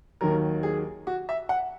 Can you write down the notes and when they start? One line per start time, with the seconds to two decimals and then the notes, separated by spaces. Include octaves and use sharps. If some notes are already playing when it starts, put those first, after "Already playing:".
0.21 D#2 D#3 F#3 A#4
0.63 G#4
1.07 F#4
1.29 E5
1.49 F#5